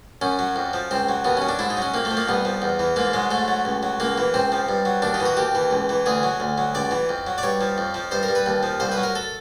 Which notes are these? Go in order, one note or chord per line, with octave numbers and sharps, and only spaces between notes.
F#2 C#4
F#3
F2
F3
C#2 C4
F#3
D#2 B3
F#3 C#4
D4
G#2 E4
D#4
F#3 C#4
F2 A#3
A3
F3
A#3
C2 B3
F3
E2
E3
G#2 A#3
F#3 G#3
G#2 A3
F#3
C#2
F#3
C#2 A#3
E3
C#2 C4
F3
G2
F#3
D#2 D4
D#4
E3
F#4
D#2 G4
E3
C#2
E3
D2 G#4
F#3
D2
F#3
C#2 D5
E3
F2
F#3
D5
G2 C#5
F3
F2
F3
G2 C5
A#4
G2
B4
D#2
F3
C2 C5
B4
F#3
A#4
A4